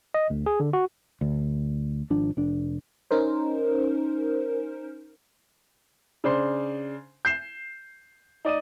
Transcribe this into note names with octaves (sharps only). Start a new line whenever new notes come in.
D#5
D2
G#4
D3
F#4
D2
G#1 F3 D4
F1 D4
C#4 D#4 A#4 C5
C#3 D4 C5 C6
G6 C7 E7
D#4 D5 D#6 D#7